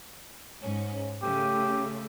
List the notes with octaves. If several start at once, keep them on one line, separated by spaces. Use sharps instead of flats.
G#2 C#4
C#3 A3 G4